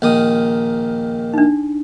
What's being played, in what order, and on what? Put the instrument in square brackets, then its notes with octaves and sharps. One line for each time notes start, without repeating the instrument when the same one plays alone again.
[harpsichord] A#1 D#3 D#6
[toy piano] D4 D#4